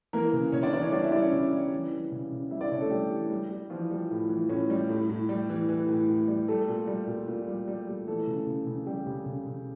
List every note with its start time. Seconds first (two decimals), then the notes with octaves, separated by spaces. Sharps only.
0.13 E3 A#3 A#4
0.33 C#3
0.52 C#3 C#4 C#5
0.62 D4 D5
0.73 E3 D4 D5
0.83 C#4 C#5
0.92 G3 D4 D5
1.03 E4 E5
1.12 G3 D4 D5
1.22 C#4 C#5
1.32 C#3 E4 E5
1.53 G3
1.72 E3
1.92 E3
2.12 C#3
2.32 C#3
2.51 G3 E4 E5
2.61 D4 D5
2.71 C#3 C#4 C#5
2.81 A3 A4
2.91 G3 G4
3.11 E3
3.30 G3
3.50 G3
3.70 E3 F3 F4
3.91 G3
4.11 A2
4.29 E3
4.49 A2 C#4
4.70 G3
4.89 A2
5.10 A2
5.29 G3
5.49 E3
5.69 E3
5.89 A2
6.09 A2
6.28 G3
6.48 G3 A3 A4
6.68 A#2
6.87 G3
7.07 A#2
7.28 A#2
7.48 G3
7.68 G3
7.87 G3
8.07 E3 A3 A4
8.27 C#3
8.47 C#3
8.67 C#3
8.86 C#3 G3 G4
9.07 C#3
9.26 C#3
9.46 C#3